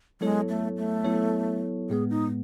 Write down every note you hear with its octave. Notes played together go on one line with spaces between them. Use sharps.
F#3 G#3 B3 E4 A4 C#5
A3
A3
F#3 B3 E4 A4 C#5
A2 G#3 B3 G#4
D#4